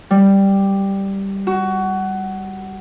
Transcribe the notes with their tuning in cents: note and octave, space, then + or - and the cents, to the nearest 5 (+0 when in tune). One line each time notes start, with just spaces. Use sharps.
G3 +0
F#4 +20